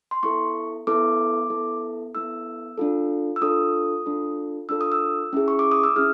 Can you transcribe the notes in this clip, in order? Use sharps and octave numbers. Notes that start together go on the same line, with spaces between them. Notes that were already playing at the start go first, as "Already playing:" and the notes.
C6
B3 E4 A4 C#6
B3 E4 A4 D6
B3 E4 A4
B3 E4 A4 E6
D4 F4 A4
E6
D4 F4 A4 D#6
D4 F4 A4
D4 F4 A4 E6
D#6
E6
C#4 E4 G#4
C#6
D6
D#6
E6
C#4 E4 G#4 F6